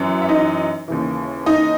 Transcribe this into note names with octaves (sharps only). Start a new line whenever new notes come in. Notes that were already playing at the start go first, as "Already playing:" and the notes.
Already playing: F#2 E3
E5
D#4 D#5
D#2 C#3 E3
D#4 D#5